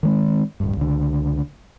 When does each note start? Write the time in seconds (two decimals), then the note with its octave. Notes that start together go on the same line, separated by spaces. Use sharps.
0.03 D#3 G#3 C4
0.60 D1 G2
0.77 C#2 D3